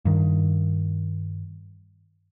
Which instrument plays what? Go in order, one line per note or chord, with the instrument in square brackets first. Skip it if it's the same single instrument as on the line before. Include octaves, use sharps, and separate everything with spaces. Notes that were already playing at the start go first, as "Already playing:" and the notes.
[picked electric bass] G2 D#3